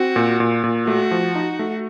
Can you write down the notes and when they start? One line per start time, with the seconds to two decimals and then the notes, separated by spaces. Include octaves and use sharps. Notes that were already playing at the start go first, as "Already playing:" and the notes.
Already playing: C4 F#4
0.16 A#2
0.40 A#2
0.64 A#2
0.87 A3 F#4
1.11 F3
1.35 D#4
1.59 A3